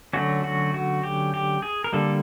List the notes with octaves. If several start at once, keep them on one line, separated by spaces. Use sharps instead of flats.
D3 F#3 A3 C#4 F#4
F#4
F#4
G4
G4
G#4
A#4
D3 G3 A#3 A4